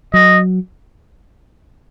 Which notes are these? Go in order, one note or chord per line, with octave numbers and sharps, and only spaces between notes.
F#3 D#5